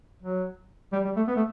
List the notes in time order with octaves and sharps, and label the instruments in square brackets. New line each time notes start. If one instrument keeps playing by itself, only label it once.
[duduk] F#3
G3
G3
A3
B3
A3